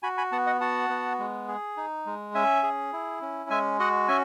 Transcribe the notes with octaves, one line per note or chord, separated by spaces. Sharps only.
F#4 G#5 B5
G#5 B5
B3 F#5 A5
D#5 F#5
F#4 F#5 A5
B3
G#3
G#4
D#4
G#3
C#4 E5 G#5
G#4
E4
C#4
G#3 E5 G#5
F#4 D#5 F#5
C#4 E5 G#5